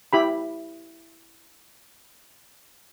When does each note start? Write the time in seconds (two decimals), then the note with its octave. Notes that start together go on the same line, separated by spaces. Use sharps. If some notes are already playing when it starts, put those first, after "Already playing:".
0.13 E4 G4 B5